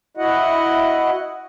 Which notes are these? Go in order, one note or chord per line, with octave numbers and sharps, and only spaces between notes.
E4 F#4 D#5 F#5